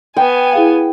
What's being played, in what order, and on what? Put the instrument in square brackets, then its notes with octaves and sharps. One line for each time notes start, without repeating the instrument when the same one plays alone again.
[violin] B3 G#5 [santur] G5
[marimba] E4 G#4 F5